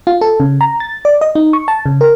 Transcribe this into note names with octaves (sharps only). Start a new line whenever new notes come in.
F4
A4
C#3
A#5
A6
D5
D#5
D#4
C#6
A5
C#3
A#4